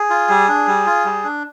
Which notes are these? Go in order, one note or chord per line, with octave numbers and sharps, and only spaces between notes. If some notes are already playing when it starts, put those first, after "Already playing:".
Already playing: G#4
F4
G3
D4
G3
F4
G3
D4